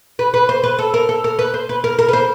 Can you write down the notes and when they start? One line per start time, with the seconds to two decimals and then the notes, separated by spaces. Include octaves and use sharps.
0.19 B4
0.34 B4
0.49 C5
0.64 B4
0.79 A4
0.94 A#4
1.09 A4
1.24 A#4
1.39 B4
1.54 C5
1.69 B4
1.84 A#4
1.99 A#4
2.09 B4
2.13 C5